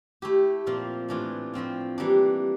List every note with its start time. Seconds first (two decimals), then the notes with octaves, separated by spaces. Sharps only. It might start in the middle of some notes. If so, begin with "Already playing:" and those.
0.22 A3 E4 G4
0.66 A#2 F3 C4 F4
1.08 A2 E3 A3 D4 F4
1.53 A2 F3 C4 F4
1.98 E3 G3 A#3 D4